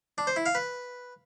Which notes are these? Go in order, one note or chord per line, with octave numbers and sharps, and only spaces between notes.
D4
C5
E4
F5
B4